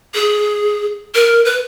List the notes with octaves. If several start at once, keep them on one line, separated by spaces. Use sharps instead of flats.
G#4
A#4
B4